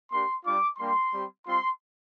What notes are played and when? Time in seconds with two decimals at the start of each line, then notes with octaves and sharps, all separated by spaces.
0.11 A#3 D4 G4 C6
0.45 G3 D4 F4 D6
0.78 G3 A#3 D4 G4 C6
1.13 G3 C4 G4
1.46 G3 C4 F4 C6